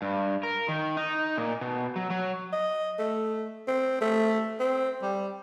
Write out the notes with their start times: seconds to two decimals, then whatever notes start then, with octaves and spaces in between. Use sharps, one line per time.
0.02 G2
0.43 A#4
0.68 D#3
0.97 D#4
1.37 A#2
1.61 B2
1.96 F#3
2.10 F#3
2.53 D#5
2.99 A3
3.67 C4
4.01 A3
4.60 C4
5.02 G3